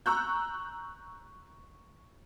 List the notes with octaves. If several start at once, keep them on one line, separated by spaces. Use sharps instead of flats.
A#5 C#6 E6 F#6 G6